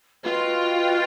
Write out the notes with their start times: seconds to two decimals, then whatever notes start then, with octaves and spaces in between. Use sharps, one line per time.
0.23 F4 F#4 B4 D#5 G5